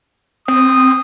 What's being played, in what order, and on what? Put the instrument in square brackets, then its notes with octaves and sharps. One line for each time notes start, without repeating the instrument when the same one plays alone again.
[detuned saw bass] C4 [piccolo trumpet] D#6